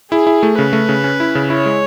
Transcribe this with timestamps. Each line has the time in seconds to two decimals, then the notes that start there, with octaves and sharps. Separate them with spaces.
0.11 E4 G#4
0.27 E4
0.43 A3
0.59 C#3 B4
0.73 A3
0.89 C#3
1.04 C#4
1.20 E4
1.35 C#3
1.50 E4 C#5
1.66 G#3